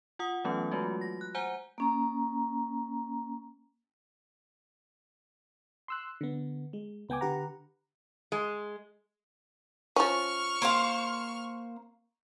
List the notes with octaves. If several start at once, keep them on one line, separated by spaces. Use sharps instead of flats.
F4 F#5 D#6
E3 F#3 A3 B3 C#4 F4
F#3 G#3 A3 F4 F#4
A#6
F#6
C5 F#5 G#5 A#5 G6 G7
A#3 C#4 A#5
C6 E6 F#6
D3 B3
G#3
C#2 B3 G5 G#5 D6
D3 G4 B4 F#5 A#5
G#3
F3 C#4 C#6 F6
A#3 C5 F5